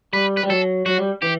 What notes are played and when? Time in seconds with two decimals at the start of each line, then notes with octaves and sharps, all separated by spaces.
0.13 G3 B4
0.37 B4
0.43 G3
0.49 F#3 A4
0.86 F#3 F#4
0.98 G3
1.22 E3 G4